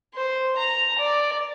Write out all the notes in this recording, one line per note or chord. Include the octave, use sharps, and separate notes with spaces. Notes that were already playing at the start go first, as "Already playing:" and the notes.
C5
A#5
D5